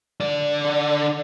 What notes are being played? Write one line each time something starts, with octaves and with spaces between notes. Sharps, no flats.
D3 D5